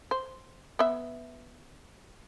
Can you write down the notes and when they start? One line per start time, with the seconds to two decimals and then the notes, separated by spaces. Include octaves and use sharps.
0.11 C5
0.79 B3 E5